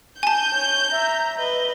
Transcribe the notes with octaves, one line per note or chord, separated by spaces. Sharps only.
G#5 A5 G6
C#5
E5 A#5
B4 D#5 G7